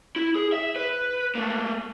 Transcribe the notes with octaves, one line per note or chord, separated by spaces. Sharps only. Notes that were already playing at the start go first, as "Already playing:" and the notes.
E4
G#4
E5
B4
A3 A#3